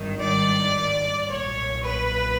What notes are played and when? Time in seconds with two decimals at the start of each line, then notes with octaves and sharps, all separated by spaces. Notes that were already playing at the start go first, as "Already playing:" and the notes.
Already playing: G#1 G2 D#3
0.22 D5
1.30 B1 A#2 C#5
1.83 B4